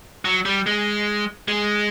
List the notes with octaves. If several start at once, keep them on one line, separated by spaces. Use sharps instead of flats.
F#3
G3
G#3
G#3